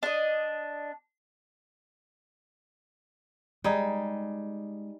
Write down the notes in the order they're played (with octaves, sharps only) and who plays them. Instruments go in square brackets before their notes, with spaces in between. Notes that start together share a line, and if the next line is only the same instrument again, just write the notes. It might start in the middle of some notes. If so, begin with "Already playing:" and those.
[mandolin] D4 D#5
[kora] G3 D#4 G#4 [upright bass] G#3